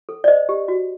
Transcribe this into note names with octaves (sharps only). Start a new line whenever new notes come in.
A4
D5
C5 D#5
G4
F#4